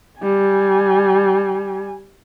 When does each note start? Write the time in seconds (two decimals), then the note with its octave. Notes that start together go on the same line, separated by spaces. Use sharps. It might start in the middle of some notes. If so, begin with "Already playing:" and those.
0.19 G3 G#5